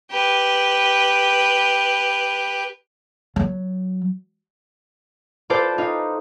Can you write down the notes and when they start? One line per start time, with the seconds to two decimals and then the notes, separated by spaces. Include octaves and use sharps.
0.11 G4 B4
3.36 F#3
5.50 F4 A4 B4 C5 D5 A5
5.78 D#4 F4